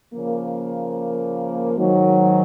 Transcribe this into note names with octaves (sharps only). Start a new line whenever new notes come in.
C#3 F3 A#3
G#2 D#3 F#3